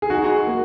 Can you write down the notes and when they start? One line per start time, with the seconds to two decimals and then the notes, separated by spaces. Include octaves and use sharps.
0.02 G#4
0.10 D#4 F#4
0.47 A#3